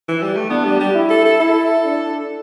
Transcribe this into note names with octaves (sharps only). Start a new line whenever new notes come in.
E3
G3
A3
B3 D4
G3
G3
E4
A4
A4
E4 A4
D4